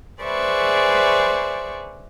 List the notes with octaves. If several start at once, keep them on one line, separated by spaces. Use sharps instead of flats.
G#4 B4 C5 D5 E5 C#6